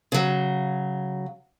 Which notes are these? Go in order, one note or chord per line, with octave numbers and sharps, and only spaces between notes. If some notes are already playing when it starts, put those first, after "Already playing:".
C#3 F#3